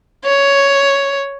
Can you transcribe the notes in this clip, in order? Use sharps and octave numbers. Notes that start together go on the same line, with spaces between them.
C#5